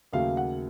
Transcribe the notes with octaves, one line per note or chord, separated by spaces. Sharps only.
D#2 C#3 F#3 A3 F5
F#5